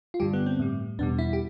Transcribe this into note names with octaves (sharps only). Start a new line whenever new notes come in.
F4
G2 D3 G3 G4
B3
C4
A2 G3
E2 B2 G3 D4
E4
G4